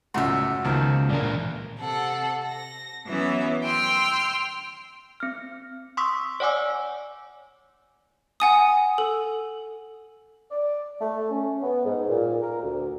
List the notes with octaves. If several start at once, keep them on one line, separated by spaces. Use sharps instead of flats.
C#2 F#2 A2 F#4 E5
C#2 D#3 F3 A#3
A#2 E3 D4 A#4
C3 A4 F#5
A#6
E3 F#3 B3 C#4 E5
G5 C6 E6 F6
C4 F6
C6 C#6 D#6 E6 B6
C#5 D5 F#5 G#5 D6 E6
F#5 G#5 D#6
A4
D5
A3
C#4
B3
G#2
A#2
A#4
D2